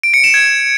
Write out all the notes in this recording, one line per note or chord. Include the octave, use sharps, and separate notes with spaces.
D7
C#7
E7
G#6